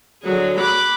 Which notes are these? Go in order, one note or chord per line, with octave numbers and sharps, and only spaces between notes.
D3 F#3 G#4
B5 D6 F#6